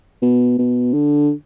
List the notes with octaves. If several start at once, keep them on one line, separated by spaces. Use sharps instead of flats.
B2
B2
D3